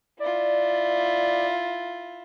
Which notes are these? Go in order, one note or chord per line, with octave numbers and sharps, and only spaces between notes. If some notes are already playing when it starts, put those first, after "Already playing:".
E4 F4 D5